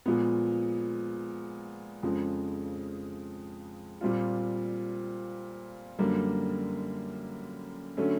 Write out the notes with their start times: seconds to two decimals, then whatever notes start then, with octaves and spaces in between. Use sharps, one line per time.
0.06 A#2 F3 G#3 B3
2.03 F2 C#3 F3 G#3
4.01 A#2 G3 C4 F4
5.99 F#2 D3 G3 A#3
7.97 D3 F#3 A3 C#4